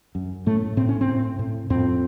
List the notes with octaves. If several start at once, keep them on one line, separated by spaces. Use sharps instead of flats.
F#2
A2 A3
A2 C4
C#4
C4
A2
A2
F2 C4